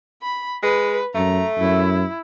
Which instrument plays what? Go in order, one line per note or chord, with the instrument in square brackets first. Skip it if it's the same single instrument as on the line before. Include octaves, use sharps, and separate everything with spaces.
[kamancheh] B5
[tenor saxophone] G#3 [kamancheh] B4
[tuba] F#2 [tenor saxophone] A3 [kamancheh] A#5
[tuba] F#2 [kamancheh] E4